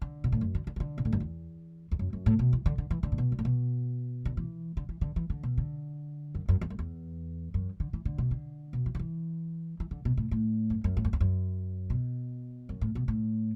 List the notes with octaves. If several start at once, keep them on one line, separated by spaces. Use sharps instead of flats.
D3
B2
A2
F#2
D3
D3
E3
D3
B2
A2
F#2
E2
E2
F#2
F#2
A2
B2
E3
D3
D3
E3
D3
A2
B2
D3
A2
B2
D3
E3
D3
E3
D3
E3
D3
B2
D3
F#2
F#2
E2
F#2
E2
F#2
D3
E3
D3
B2
D3
B2
E3
D3
E3
E3
D3
B2
A2
A2
F#2
F#2
A2
F#2
E2
F#2
B2
F#2
A2
B2
A2